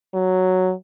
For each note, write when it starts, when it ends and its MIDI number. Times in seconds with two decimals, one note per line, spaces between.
0.14 0.73 54